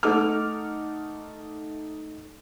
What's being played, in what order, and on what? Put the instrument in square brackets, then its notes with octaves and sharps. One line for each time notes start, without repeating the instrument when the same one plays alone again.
[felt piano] A3 D#4 A4 F#5 D6 F6